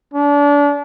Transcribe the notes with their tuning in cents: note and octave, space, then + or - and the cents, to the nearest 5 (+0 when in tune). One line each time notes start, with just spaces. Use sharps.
D4 -30